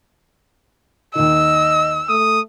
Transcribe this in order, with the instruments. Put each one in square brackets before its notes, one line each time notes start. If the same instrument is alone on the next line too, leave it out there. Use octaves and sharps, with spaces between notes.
[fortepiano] D#2 D#3 [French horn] D#5 [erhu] E6
[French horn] A3 [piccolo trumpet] D#6